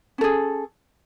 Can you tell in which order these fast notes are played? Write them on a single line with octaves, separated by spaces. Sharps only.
C#4 A4 G#4